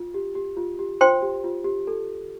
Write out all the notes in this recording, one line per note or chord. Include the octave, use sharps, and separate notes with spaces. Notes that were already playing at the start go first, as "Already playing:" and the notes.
Already playing: F4
G4
G4
F4
G4
F4 C5 G5 C6
G4
F4
G4
A4